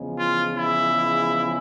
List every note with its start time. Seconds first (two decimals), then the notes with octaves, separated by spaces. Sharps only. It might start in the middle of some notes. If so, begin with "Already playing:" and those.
Already playing: E2 C#3 F3 G#3
0.16 F4
0.55 E4